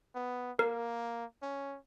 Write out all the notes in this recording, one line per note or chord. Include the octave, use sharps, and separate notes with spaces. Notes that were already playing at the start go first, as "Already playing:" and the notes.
B3
A#3 A#4
C#4